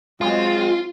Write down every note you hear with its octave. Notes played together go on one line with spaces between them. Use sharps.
F#3 G#3 C4 F4